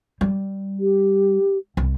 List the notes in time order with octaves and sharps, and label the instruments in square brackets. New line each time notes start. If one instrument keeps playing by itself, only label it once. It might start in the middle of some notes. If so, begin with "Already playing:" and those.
[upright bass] G3
[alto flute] G4
[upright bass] C2